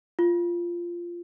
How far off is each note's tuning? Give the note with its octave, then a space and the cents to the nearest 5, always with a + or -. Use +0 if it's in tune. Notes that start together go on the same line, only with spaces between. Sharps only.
F4 -10